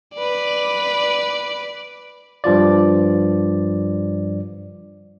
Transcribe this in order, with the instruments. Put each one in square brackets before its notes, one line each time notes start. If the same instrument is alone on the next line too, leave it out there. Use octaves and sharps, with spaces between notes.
[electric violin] B4 D5
[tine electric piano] G2 F3 F4 D5